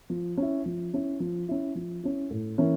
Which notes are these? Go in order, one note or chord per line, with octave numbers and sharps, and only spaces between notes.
F3
C#4 E4
F3
C#4 E4
F3
C#4 E4
F3
C#4 E4
A2
E3 A#3 C#4 E4